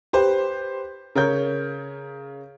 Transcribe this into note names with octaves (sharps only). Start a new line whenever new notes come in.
G4 B4 C5
C#3 A#4 C#5 G6